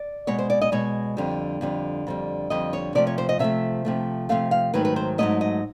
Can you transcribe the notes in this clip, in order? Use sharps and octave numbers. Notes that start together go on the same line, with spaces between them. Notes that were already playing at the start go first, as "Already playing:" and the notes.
Already playing: D5
B2 G#3 C#5
C5
D5
D#5
B2 G#3 C#5
F2 D3 G3
F2 D3 G3
F2 D3 G3
F2 D3 G3 D#5
C#5
C3 F3 A3 D5
C#5
C5
D#5
C3 F3 A3 E5
C3 F3 A3
C3 F3 A3 F5
F5
G#2 D#3 F#3 A3 B4
B4
C5
G#2 D#3 F#3 A3 D#5
D#5